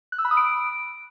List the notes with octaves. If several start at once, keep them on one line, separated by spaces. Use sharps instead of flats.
F#6
E6
B5
D#6
D7